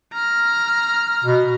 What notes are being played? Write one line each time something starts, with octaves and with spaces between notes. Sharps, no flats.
A#5 F6
B2